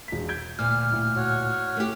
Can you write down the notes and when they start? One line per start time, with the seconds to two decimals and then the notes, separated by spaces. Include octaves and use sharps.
0.08 E1 B6
0.29 G6 G#6 D7
0.59 D2 A#2 F6
0.92 A2
1.16 F#4 C#5
1.77 A3 G4